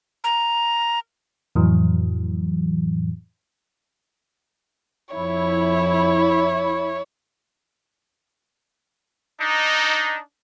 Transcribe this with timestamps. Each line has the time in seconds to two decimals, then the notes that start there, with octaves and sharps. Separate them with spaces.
0.24 A#5
1.55 F2 A2 E3 F#3
5.15 F2 E4 C#5
9.41 D4 D#4